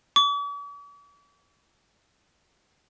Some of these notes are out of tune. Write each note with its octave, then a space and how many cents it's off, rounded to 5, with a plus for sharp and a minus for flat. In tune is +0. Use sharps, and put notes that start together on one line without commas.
D6 -45